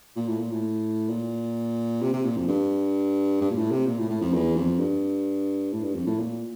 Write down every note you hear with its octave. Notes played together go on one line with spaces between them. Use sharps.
A#2
A2
A#2
A2
A#2
C3
C3
A#2
F2
G2
G2
A#2
A2
C3
A#2
A2
A2
F2
E2
F2
G2
A2
G2
F2
A2
A#2